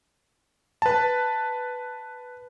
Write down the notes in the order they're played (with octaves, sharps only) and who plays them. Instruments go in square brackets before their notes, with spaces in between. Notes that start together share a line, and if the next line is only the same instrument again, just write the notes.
[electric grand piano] B4 A5